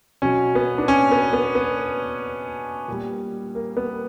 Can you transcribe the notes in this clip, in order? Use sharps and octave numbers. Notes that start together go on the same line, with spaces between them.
B2 F#3 C#4
B3
D4
C#4
B3
B3
B3
A#2 G3
A#3
B3